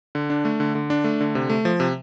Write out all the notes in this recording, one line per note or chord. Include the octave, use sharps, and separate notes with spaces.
D3
D4
A3
D3
D3
D4
A3
D3
C3
A3
F3
C3